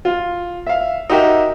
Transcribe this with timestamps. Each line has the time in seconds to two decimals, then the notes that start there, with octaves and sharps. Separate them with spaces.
0.05 F4
0.66 E5 F5
1.10 D#4 F#4 G4 A#4 E5